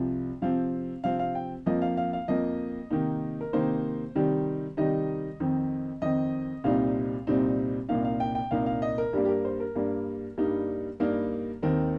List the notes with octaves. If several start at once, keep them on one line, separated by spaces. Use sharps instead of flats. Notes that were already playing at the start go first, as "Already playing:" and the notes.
Already playing: C2 C3 F3
C3 F3 C4 F5
C3 F3 C4 F5
F5
G5
F2 F3 A#3 D#5
F5
F5
F5
F2 F3 A#3 D#5
C3 D#3 A#3 D#4
A#4
C3 D#3 A#3 D#4 C5
C3 D#3 G3 D#4
C3 D#3 G3 D#4 D#5
F2 D#3 C4
F2 D#3 C4 D#5
C2 A#2 G3 C4 D#4 F5
C2 A#2 G3 C4 D#4
C2 A#2 A#3 D#4 F5
F5
G5
G5
C2 A#2 A#3 D#4 F5
F5
D#5
A#4
G2 G3 A#3 G4
G4
A#4
C5
A#4
G2 G3 A#3
G2 G3 A#3 D#4
G2 G3 A#3 D#4 A#4
D#2 D#3 C4 D#4 A#4